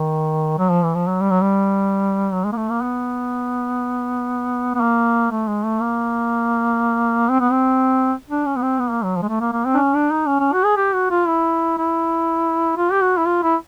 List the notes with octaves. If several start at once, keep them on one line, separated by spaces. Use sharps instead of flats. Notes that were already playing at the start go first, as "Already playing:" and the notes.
Already playing: D#3
F#3
F3
E3
F3
F#3
G3
F#3
G3
F#3
G#3
A#3
A3
A#3
B3
B3
A#3
A3
G#3
A3
A#3
C4
B3
C4
D4
C#4
B3
C4
B3
A#3
F#3
F3
G#3
A3
A#3
A#3
C4
D4
C#4
D4
D#4
C#4
C#4
F#4
G#4
G4
F#4
F4
E4
E4
F4
G4
F#4
E4
F4
E4